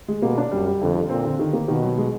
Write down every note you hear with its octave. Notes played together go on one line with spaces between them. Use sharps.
G#3
B2 A#3
D4
F#2 G3
G3
F2 D3
D3
A#2 C4
D3
D#3
A#3
B2 D#3
F#3
G#3